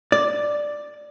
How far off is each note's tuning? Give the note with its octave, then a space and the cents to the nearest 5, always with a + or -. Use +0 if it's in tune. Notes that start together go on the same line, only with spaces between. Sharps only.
D5 +5